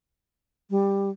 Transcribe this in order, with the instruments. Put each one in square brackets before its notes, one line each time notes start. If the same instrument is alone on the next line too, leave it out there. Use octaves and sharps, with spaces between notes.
[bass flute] G3